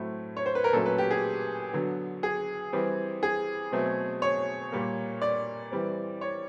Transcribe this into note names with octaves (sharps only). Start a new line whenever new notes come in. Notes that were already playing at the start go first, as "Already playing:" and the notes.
Already playing: A2 F#3 A3 C4
C#5
C5
B4
A#4
A#2 F#3 A3 C#4 A4
B4
G4
G#4
D3 F#3 B3
G#4
E3 G3 C4
G#4
B2 F#3 A3 C4
C#5
A#2 G3 A#3
D5
E3 G3 C4
C#5